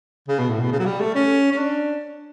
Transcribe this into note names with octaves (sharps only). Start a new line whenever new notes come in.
C#3
B2
A2
B2
C#3
F#3
G3
A3
C#4
C#4
D4